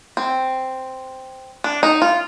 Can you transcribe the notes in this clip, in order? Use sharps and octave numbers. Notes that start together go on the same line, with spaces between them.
C4
D4
D#4
F4